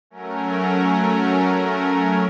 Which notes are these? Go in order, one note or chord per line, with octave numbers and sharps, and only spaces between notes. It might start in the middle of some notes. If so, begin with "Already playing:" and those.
F#3 A3 C#4 A#4